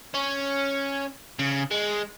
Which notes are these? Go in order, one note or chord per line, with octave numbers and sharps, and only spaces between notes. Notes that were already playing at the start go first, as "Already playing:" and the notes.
C#4
C#3
G#3